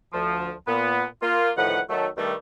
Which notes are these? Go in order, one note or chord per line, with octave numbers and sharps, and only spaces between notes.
D2 F3
A#2 B3
A#3 F4
D2 A2 D#3 F3 B4 F#5
D#3 F#3 A3
G2 D#3 G3 A3